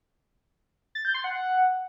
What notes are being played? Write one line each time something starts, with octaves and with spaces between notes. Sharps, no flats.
A6
G6
C6
F#5